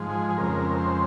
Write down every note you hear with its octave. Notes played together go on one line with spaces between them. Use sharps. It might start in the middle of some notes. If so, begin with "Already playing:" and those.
Already playing: G#2 F3 G#3
G#4
G#4
F2 C#3 G#3 C4 A#4
A#4
C5